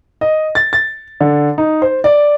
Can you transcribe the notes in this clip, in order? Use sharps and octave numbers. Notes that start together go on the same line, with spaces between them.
D#5
A6
A6
D3
D#4
C5
D5